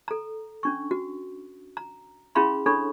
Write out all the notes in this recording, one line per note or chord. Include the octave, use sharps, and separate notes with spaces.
A4 A#5
C#4 D4 C#6
F#4
A#5
C#4 E4 G#4 F5 B5 C6
D4 A4 C#5 B5 C#6